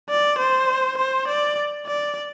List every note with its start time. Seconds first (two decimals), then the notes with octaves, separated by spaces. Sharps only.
0.10 D5
0.38 C5
0.98 C5
1.27 D5
1.86 D5